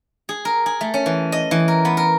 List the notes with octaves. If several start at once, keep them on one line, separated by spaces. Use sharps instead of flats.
G#4
A#4
G#4
A3
C#4
E3
D#5
E3
A#4
B3
A#4